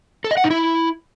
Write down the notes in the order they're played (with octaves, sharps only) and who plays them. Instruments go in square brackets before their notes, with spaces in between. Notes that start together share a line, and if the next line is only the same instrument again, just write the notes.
[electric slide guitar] A4
D#5
F#5
D#4
E4